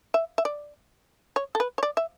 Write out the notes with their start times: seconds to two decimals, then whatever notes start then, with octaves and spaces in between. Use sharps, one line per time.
0.14 E5
0.38 E5
0.45 D5
1.36 C#5
1.55 A4
1.60 B4
1.78 C#5
1.83 D5
1.97 E5